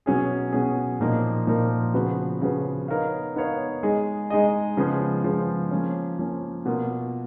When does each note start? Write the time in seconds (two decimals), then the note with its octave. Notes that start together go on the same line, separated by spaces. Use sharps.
0.06 B2 F#3 C#4 G#4
0.53 B2 F#3 C#4 G#4
1.00 A#2 F3 A#3 D#4 A#4
1.47 A#2 F3 A#3 D#4 A#4
1.94 C#3 F3 B3 F#4 B4
2.41 C#3 F3 B3 F#4 B4
2.88 B3 D#4 A#4 C#5 F5
3.36 B3 D#4 A#4 C#5 F5
3.83 G#3 D#4 G#4 D#5
4.30 G#3 D#4 G#4 D#5
4.77 C#3 F3 G#3 B3
5.24 C#3 F3 G#3 B3
5.71 F3 A#3 C#4
6.19 F3 A#3 C#4
6.66 B2 A#3 F4 A#4